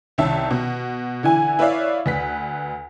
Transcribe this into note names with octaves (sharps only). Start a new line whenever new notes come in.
C2 D#3 C#4 E5 A5
B2
D3 E3 E4 G#5
E4 B4 C#5 D5 E5 F5
D2 B4 B6